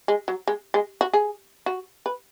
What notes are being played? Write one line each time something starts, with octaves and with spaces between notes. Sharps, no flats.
G#3
F#3
G#3
G#3
F#4
G#4
F#4
B4